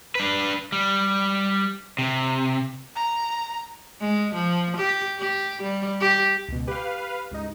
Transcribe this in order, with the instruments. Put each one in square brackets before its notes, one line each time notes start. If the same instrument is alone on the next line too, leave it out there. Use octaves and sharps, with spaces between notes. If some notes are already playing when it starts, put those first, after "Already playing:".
[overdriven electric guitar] D4 B4
G3
C3
[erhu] A#5
[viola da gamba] G#3
F3
G4
G4
G3
G4
[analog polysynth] C#2 B2
[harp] G4 [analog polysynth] B4 F5
[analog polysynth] C#2 G#2 D#4